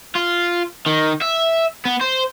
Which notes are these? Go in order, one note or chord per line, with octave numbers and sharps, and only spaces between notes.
F4
D#3
E5
B3
C5